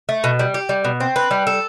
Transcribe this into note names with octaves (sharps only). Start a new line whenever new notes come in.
A3
B2
G3
G4
G3
B2
C4
B4
G3
A4